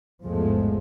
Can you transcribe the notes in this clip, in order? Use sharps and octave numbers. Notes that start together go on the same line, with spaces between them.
A1 E2 G#2 F3 G#3 A3